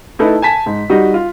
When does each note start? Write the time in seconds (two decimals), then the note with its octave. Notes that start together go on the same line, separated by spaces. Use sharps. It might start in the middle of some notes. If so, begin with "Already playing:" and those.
0.19 A3 D#4 E4 A4 B4
0.42 G#5 A5 B6
0.66 G#2
0.90 G3 D#4 F#4
1.14 F4